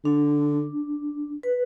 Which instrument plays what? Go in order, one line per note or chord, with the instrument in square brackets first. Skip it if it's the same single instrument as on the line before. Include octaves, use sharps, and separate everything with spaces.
[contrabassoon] D3 [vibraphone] D4
[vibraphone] B4